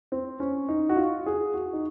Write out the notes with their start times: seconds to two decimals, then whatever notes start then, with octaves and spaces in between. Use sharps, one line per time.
0.12 C4
0.40 C#4
0.69 D#4
0.89 F#4
0.97 F4
1.26 G#4
1.54 F#4
1.73 D#4